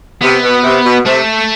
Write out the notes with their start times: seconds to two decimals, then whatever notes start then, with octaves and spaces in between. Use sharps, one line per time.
0.22 C3 B3
0.42 B2
0.63 C3
0.85 B2
1.05 C3 A3